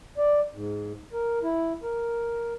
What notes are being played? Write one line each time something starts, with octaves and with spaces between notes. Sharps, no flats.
D5
G#2
A#4
E4
A#4